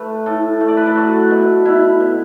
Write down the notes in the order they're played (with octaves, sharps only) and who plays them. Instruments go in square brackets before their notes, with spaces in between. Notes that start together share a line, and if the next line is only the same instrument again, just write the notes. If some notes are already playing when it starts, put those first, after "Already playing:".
Already playing: [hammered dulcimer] A3 B4
A2 A4
A3
D5
B4
A4
F#3 F#4
B2
B2 E4
B2